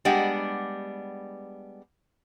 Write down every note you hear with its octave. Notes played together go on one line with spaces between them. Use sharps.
G3 G#3 B3 D4 G4 F#5